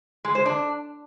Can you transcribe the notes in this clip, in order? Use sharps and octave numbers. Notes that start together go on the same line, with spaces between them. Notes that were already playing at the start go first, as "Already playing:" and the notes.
G#3
C5
D4